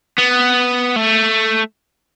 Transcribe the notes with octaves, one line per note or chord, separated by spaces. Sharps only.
B3
A3